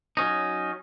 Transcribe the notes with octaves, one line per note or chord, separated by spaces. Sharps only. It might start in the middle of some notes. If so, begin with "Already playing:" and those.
F#3 C#4 D#4